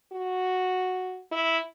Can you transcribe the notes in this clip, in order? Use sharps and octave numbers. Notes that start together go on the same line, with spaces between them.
F#4
E4